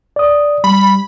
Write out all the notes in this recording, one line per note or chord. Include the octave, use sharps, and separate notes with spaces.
D5 D#6
G3 B5